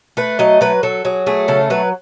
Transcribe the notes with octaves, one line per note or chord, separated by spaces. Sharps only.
A3 B4
F#3 D#5
F#3 B4
F#3 A4
F#3 G#4
A3 G#4
C#3 A4
F#3 B4